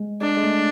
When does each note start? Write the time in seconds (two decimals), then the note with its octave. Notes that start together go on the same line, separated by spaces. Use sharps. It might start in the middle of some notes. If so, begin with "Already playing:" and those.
Already playing: G#3
0.21 G#3 D4
0.37 G#3
0.43 A3